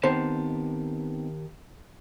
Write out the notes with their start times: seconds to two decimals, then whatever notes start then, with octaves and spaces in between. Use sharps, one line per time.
0.03 D#3 B3 C4 D#4 G4 C5 A5